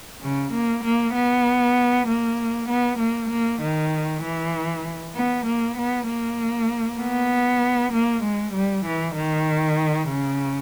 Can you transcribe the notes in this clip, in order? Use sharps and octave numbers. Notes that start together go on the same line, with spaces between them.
C#3
A#3
A#3
B3
A#3
B3
A#3
A#3
D#3
E3
B3
A#3
B3
A#3
B3
A#3
G#3
G3
E3
D#3
C#3